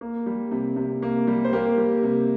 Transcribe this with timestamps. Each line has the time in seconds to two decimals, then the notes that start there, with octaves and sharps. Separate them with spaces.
0.01 A#3
0.26 G3
0.52 C3
0.76 C3
1.02 A#3
1.27 G3
1.45 C5
1.53 A#3 G4 A#4
1.78 G3
2.03 C3